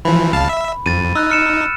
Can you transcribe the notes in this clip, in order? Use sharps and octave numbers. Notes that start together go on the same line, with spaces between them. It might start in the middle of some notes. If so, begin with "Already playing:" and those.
E3 F3 B5
C#2 F5 A5
E5
F2 A6 D#7
D#4 E6 F#6
F6 C#7 E7